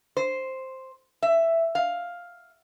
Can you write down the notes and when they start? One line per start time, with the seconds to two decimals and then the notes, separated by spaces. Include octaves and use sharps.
0.17 C5
1.23 E5
1.75 F5